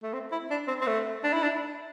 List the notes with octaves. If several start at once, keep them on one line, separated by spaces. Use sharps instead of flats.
A3
C4
E4
D4
C4
C4
A3
D4
E4
D4